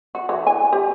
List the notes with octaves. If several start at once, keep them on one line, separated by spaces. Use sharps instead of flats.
F#4
E3
G#5
G4